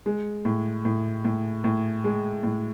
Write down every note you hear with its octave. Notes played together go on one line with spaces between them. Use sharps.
G#3
A2
A2
A2
A2
G#3
A2